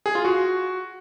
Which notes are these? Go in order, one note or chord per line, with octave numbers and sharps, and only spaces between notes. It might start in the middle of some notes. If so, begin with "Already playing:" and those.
G#4
F4
F#4